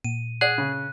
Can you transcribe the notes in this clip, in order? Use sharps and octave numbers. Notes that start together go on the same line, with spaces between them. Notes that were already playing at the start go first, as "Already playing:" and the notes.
A#2 D#7
G#4 D5 F#5 F#6
C#3